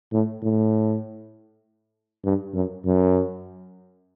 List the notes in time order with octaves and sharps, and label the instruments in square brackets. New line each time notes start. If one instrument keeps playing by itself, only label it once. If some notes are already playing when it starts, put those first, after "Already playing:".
[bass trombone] A2
A2
G2
F#2
F#2